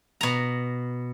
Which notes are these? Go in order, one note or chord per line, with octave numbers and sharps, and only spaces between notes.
B2 A#5